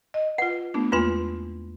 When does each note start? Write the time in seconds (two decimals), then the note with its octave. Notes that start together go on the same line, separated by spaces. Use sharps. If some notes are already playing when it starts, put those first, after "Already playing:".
0.14 D#5
0.38 F4 B4 F#5
0.74 A3 B3 D4
0.92 E2 G#3 A#3 F4 B4 C6